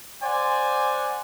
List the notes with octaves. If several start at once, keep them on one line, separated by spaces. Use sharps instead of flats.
C5 D5 F#5 G#5